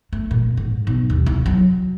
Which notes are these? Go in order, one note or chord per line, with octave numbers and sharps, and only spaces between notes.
A3
A#2
G#2
B1
D#2
C2
F#3